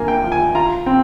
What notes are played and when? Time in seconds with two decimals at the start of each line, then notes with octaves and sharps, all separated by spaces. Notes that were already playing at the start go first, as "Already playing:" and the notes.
Already playing: F2 D3 A#3 G#5
0.08 G5
0.24 F3
0.32 G#5
0.55 F4 A#5
0.86 C4